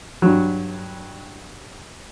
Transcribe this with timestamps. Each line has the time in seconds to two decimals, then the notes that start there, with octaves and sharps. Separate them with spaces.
0.22 G2 F#3